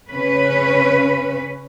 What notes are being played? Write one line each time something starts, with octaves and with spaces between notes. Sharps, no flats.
C#3 C#4 B4